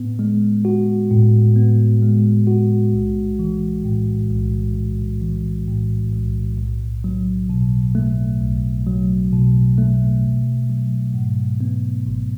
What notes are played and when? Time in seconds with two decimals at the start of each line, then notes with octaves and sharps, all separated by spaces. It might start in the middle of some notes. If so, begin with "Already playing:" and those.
Already playing: A2 B3
0.19 G#3
0.65 F#4
1.11 A2
1.56 B3
2.02 G#3
2.47 F#4
2.93 B1
3.39 E3
3.84 A2
4.30 B1
4.76 B1
5.22 E3
5.67 A2
6.13 B1
6.58 B1
7.04 F#3
7.49 B2
7.95 A3
8.41 B1
8.87 F#3
9.32 B2
9.78 A3
10.23 G#1
10.69 F#3
11.14 G#2
11.61 B3
12.06 G#1